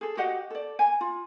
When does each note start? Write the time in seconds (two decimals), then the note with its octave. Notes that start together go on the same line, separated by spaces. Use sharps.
0.01 G#4 A4
0.17 F#4 G4 D#5 F#5
0.50 A4 D5
0.79 G#5
1.01 F4